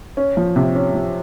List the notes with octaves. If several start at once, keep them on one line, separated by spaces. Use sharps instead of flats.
C#4
F3
C3
C#4
F3